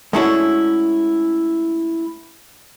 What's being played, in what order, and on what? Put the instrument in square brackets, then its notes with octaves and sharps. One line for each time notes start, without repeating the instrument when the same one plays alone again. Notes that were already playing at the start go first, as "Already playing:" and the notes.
[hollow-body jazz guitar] G#3 A3 C#4 D4 E4 F#4